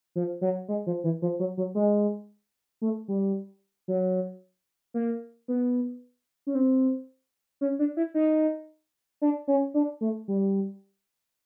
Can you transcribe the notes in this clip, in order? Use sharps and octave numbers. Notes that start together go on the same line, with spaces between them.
F3
F#3
G#3
F3
E3
F3
F#3
F#3
G#3
A3
G3
F#3
A#3
B3
C#4
C4
C#4
D4
E4
D#4
D4
C#4
D4
A3
G3